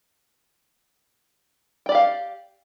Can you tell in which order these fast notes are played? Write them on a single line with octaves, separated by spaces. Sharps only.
G5 D5 G4 F5